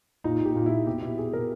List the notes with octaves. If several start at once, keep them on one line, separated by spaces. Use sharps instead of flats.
A#2 D#4
A#2 G4
A#2
A#2 E4
B2 G4
B2 E4
B2 G#4
B2 A#4